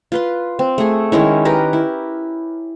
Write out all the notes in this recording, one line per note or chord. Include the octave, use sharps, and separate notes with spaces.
F4 B4 C6
C4
A3 G#4
D#3 G#3 C#4 E4
G4 A#4 B4 D#5
E4